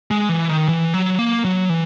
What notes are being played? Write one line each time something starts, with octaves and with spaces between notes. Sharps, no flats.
G#3
E3
D#3
E3
F#3
A#3
F#3
E3